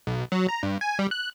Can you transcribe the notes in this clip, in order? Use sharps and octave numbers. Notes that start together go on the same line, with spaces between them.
B1
F#3
A#5
G2
G#5
G3
F#6